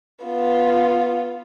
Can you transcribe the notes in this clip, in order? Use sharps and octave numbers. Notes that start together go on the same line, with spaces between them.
B3 F4